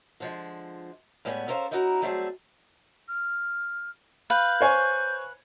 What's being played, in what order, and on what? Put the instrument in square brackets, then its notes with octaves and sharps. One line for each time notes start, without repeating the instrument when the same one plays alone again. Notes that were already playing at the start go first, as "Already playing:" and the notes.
[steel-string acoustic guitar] D3 F3 G#3
A2 G3 G#3 B3 F#5 G#5
C#4 A4 A#4 C5 F5
C#4 D#4 E4 F#4 A#4
F#3 G3 A3 C4 G#4 A4
[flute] F6
[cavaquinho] B4 F5 [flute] G6
[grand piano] C5 C#5 G#5